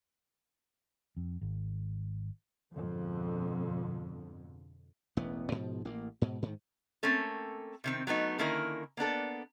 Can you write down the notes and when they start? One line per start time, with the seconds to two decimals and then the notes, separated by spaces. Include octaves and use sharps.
1.17 F2
1.41 G#1
2.73 F2 G#2 B2 D3
5.17 E1 A1 B3
5.52 G#2 B2 F3
5.85 A1 A#3
6.22 G#2 B2
6.42 G#2 D#3
7.03 A3 A#3 C4 C#4 A4
7.84 C3 D#3 C4
8.07 F#3 A3 B3 D#4
8.38 D3 D#3 A#3 C#4 E4 A#4
8.97 A#3 B3 D4 A4